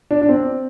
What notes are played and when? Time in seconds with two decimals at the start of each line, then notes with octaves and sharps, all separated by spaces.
0.11 D4
0.21 D4
0.29 C4